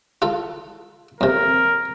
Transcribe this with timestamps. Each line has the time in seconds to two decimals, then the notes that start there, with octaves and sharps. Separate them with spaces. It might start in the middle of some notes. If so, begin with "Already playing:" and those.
0.22 F4 A4
1.21 F2 C3 A#4